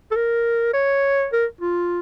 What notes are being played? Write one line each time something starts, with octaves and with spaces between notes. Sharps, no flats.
A4
A#4
C#5
A#4
F4